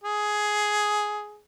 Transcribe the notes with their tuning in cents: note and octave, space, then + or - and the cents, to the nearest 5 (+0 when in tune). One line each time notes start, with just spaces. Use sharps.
G#4 +10